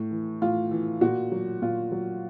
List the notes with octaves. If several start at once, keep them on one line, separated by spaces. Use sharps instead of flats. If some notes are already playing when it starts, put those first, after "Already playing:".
Already playing: A2
E3
A2 F4
E3
A#2 F#4
F#3
A#2 F4
F#3